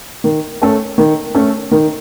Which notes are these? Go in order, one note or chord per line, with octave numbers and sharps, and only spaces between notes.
D#3
A3 C#4 A4
D#3
A3 C#4 A4
D#3